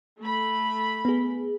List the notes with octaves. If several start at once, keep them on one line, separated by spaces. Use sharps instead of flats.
A3 B5
B3 G#4